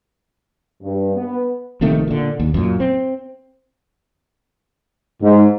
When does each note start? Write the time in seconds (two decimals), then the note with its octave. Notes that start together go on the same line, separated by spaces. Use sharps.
0.83 G2
1.15 B3
1.81 A#1 C3 D#3 A3
2.07 A#2 D3
2.40 D#2
2.54 F#2 A#2
2.80 C4
5.21 G#2